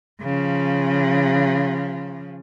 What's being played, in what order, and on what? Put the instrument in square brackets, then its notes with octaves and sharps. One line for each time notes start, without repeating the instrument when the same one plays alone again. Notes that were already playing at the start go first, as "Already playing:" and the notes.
[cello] C#3 F3